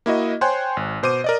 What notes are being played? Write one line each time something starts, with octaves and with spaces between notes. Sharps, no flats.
A#3 E4 F#4 D#5
C5 C#5 G5 G#5 C6 F#6
G#1
B2 C5 D6 D#7
A#4 D5 D#5